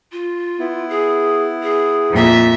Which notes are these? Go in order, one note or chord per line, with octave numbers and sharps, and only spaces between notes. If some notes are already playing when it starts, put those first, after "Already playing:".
F4
B3 E4
G#4
G#4
F2 A#2 E5